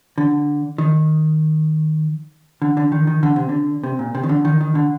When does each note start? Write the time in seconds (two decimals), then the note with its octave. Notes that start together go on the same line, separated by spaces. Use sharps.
0.18 D3
0.78 D#3
2.62 D3
2.77 D3
2.92 D#3
3.07 D#3
3.23 D3
3.36 C3
3.49 D3
3.84 C3
3.99 A#2
4.15 C3
4.23 D#3
4.29 D3
4.45 D#3
4.61 D#3
4.75 D3